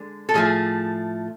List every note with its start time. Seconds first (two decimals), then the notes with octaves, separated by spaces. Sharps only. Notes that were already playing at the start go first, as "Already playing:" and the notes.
Already playing: D3 G#3
0.29 A4
0.34 A2 F3 A3 G#4